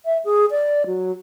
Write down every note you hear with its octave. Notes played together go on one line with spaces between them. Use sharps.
E5
G#4
D5
F#3